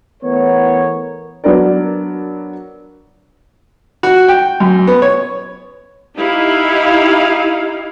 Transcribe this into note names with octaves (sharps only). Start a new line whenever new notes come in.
E3 A3 B3 A#4 C#5
F#3 B3 D4 A#4 D5
F#4
G5
F#2
B3
C#5
D#4 E4 G4 F5